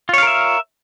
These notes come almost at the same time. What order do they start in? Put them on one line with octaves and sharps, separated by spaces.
F4 C#5 F5 A#4 E5